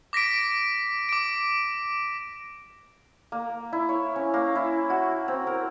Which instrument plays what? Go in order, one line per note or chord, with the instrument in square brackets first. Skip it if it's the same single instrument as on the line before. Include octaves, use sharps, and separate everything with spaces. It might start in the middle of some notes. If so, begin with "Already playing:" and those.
[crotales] D6 A#6 B6 D7
D6 D7
[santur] A#3
E4
C#5
C#4
A#3
E4
F#4
C4
A#4